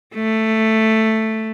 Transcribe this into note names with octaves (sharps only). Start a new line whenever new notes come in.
A3